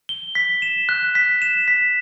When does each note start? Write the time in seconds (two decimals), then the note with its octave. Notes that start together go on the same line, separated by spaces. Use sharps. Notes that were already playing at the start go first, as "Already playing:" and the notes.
0.09 G7
0.35 B6
0.62 E7
0.89 F#6
1.15 B6
1.42 E7
1.68 B6